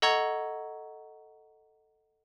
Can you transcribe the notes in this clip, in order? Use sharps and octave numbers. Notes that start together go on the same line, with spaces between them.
A4 D#5 F#5 A#5 C#6 G#6